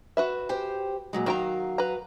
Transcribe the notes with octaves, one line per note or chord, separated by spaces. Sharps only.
F#4 B4 E5
G4 C5 G5
A#2 F#3 G#3
D#3 F#3 F5 G5 A#5
B4 A#5